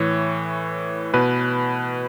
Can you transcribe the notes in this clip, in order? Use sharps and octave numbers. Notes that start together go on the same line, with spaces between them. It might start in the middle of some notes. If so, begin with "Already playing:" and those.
Already playing: A2 E3 C#5
B2 B4